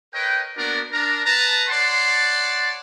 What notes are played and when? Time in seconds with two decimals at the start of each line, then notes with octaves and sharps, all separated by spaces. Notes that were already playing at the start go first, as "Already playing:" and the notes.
0.14 A#4 B4 C#5 D#5 G5
0.57 A#3 B3 D4 F#4 A#4 D5
0.92 D4 A#4 A#5
1.25 B4 A5 A#5
1.69 C#5 D5 F#5 A5 C6